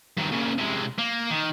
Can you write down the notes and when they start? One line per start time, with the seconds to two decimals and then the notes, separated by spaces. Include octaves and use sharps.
0.17 G2 D#3
0.32 A#2 C#3
0.58 C3 G#3
0.98 A#3
1.30 D#3